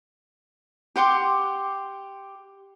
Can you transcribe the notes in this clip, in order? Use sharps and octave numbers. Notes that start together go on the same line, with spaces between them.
G4 F#5 C6 D6